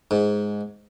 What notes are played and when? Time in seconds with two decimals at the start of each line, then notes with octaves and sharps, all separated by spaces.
0.11 G#2